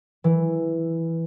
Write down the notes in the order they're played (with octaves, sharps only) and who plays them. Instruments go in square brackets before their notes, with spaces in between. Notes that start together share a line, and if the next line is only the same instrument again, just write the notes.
[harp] E3